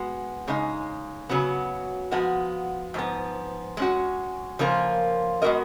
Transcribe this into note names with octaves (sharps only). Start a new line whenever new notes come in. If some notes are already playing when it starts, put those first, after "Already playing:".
Already playing: G#3 B3 F#4
C#3 G#3 D#4
C#3 F#3 B3 F#4
F3 G#3 B3 F#4
G#2 F3 B3
G#3 C#4 F#4
C#3 F3 A#3 F4 A#4
G#3 B3 F#4 A#4 D#5